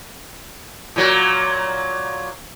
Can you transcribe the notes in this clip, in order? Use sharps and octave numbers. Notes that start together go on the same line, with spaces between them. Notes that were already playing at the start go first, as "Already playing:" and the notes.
A#2 F#3